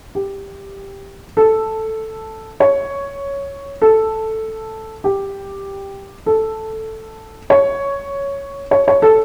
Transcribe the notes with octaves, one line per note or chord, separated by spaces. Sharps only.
G4
A4
C#5
A4
G4
A4
C#5
C#5
C#5
A4